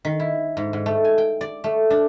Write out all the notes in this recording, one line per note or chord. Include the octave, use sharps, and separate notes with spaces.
D#3
E4
G#2
G#2
A3
G#5
G5
D5
A3
D4